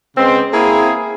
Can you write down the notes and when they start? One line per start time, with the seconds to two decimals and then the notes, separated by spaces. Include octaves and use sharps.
0.17 C#3 G#3 B3 C4
0.54 A#3 C4 E4 G#4